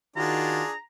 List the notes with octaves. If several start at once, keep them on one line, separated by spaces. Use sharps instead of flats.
D#3 D4 F4 F#4 G#4 A#5